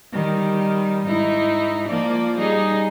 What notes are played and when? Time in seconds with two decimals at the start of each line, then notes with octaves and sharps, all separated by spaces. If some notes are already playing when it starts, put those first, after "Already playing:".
0.13 D#3 G3
1.05 G#2 D#4 E4
1.88 F3 A#3 D5
2.38 G3 D#4 G#4